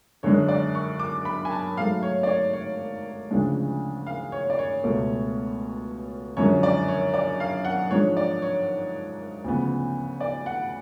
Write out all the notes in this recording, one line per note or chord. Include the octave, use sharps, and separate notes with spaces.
F#2 D3 G#3 D4 C#5
D5
C#6
D6
B5
G#5
A5
G#2 F#3 A3 F5
C#5
D5
C#5
C#5
D2 C#3 F3 G#3 D4
F5
C#5
D5
C#5
C#2 B2 A3
F#2 D3 F3 G#3 C#4 C#5
D5
C#5
D5
F5
F#5
G#2 F3 G#3 D4 C#5
D5
C#5
D2 C#3 F3 B3
D5
F#5